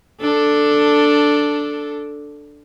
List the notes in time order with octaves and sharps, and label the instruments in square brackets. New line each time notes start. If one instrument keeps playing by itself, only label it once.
[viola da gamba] D4 A4